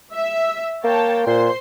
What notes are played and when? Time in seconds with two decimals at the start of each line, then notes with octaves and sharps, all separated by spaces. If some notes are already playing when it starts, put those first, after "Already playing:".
0.13 E5
0.84 A#3 C#5 G5 A5
1.27 A#2 C5 C6